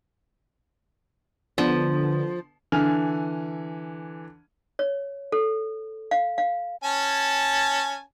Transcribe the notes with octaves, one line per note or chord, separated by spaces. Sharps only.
D3 F3 B3
D3 E3 G#5 F6 F7
C#5
A4
F5
F5
C#4 G#5 A5